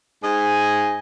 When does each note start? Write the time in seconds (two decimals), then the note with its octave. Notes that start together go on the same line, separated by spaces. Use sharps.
0.23 G#2 D#5 G#5